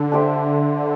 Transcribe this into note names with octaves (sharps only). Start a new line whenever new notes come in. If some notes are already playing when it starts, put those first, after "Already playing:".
Already playing: D3 A4
D4 G4 C5 E5